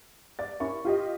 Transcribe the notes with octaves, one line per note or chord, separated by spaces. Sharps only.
D5 A6
C#4 E4 A#4 C#6
F4 G4 D#5